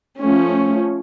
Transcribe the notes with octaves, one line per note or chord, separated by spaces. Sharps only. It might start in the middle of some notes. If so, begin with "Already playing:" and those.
F3 A3 C#4